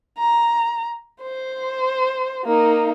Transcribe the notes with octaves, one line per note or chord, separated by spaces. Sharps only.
A#5
C5
A#3 D#4